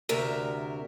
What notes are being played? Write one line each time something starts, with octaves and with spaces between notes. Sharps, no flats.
D2 C3 A#4 E5